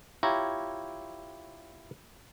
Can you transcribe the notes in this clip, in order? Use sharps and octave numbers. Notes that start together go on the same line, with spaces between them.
E4 F4 G4 C#5 A#5